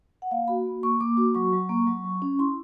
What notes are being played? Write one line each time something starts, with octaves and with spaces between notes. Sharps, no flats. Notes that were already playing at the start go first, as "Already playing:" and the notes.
F#5
A#3 F5
F#4 B5
A#3
A#3 C#6
A#3 D6
F#4 D6
F#3 C#6
F#3
A#3
F#3
F#3
C#4
E4 C6